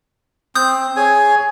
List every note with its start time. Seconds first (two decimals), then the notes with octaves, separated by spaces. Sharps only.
0.55 C4 D#6 G6
0.96 G#4 C#5 G#5